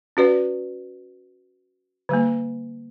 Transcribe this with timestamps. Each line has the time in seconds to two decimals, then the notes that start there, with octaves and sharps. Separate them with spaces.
0.17 C#4 F#4 B4 D5
2.09 D3 G3 A#3